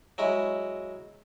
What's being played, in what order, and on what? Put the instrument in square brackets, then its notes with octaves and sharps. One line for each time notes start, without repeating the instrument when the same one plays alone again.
[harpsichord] F#3 G#3 E4